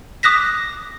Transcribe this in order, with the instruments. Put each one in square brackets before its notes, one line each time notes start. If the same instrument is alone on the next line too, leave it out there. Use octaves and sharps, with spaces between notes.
[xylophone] D6 D#6 F#6 A#6 B6